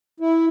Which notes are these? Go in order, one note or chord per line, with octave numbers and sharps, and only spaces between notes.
E4